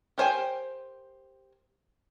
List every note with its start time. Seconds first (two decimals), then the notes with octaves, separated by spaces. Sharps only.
0.18 G4 A#4 C5 G5 G#5